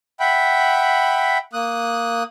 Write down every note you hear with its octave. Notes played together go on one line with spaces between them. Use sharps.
E5 F#5 G5 B5
A#3 D#6 F#6